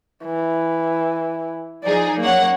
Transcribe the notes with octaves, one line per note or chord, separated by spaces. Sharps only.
E3
F3 D#4 G#4 D5
F#2 A#3 C#5 F#5